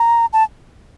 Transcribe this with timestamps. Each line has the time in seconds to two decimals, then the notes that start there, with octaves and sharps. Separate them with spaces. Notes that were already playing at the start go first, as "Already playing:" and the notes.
Already playing: A#5
0.33 A5